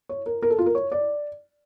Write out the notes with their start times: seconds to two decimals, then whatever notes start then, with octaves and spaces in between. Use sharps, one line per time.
0.09 C#5
0.26 A#4
0.42 A#4
0.50 A4
0.58 F4
0.66 A#4
0.75 C#5
0.92 D5